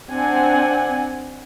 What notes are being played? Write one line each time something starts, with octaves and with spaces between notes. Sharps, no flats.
C4 D4 F#5 G#5